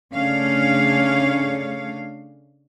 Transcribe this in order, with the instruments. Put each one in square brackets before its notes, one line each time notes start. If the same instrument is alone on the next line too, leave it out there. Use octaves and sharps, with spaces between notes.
[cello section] C#3 A3 C#4 D4 C#5 F5